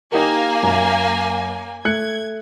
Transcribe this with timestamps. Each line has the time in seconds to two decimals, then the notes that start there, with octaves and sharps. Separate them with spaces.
0.12 A#3 D#4 G4 A#4 G#5
0.63 F#2
1.85 A3 F#6 G#6 C#7